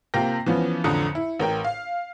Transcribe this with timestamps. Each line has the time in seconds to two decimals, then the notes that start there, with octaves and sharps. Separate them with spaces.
0.14 C3 A#3 F4 G5 A#6
0.46 E3 F3 B3 C#4
0.84 A1 F2 D3 A#5 D#6 C#7
1.15 E4
1.39 A1 A#4 G5
1.64 F5